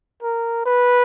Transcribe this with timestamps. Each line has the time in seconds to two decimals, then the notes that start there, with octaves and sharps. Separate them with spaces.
0.23 A#4
0.66 B4